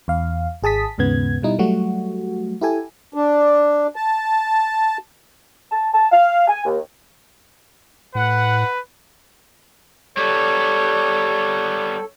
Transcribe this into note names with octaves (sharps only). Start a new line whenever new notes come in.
E2 F5
G#1 G#4 A5 D#6 B6
D#2 G#2 C#3 B3 G#6
B2 G3 D#4 E4
F#3 G3 A3 F#4
E4 G4 A4 G#5
D4
A5
A5
A5
F5
G#5
D#2
A2 B4 F#5
G3 B3 A4 C#5